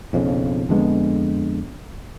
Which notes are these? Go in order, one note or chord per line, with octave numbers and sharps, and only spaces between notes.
B1 F2 C#3
F2 D3 G#3 B3